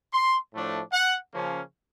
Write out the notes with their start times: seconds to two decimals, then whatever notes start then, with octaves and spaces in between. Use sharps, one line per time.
0.12 C6
0.52 A2 F3 A3 D4
0.92 F#5
1.33 C#3 F3 A#3 C#4